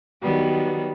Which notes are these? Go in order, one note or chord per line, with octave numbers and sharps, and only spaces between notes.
D#3 F#3 G3 B3